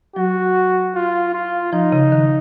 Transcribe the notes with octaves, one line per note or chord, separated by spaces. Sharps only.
F#3 F#4
F4
F4
F3 D#4
C#3
D#3